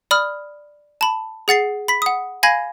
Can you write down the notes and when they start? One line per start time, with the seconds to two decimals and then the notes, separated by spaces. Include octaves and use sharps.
0.11 D5 B5 D#6 F6
1.01 A5 B5
1.48 G#4 F#5 A6 C7
1.88 B5 B6
2.02 F#5 D#6
2.43 F5 G#5 B5 G#6 A#6